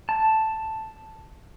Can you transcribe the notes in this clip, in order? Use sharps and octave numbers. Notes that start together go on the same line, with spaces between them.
A5